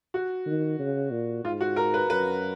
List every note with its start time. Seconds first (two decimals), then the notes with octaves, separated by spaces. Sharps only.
0.14 F#4
0.46 D#3
0.79 C#3
1.11 A#2
1.44 G#2 F4
1.61 F#4
1.76 A#4
1.94 B4
2.09 F#2 B4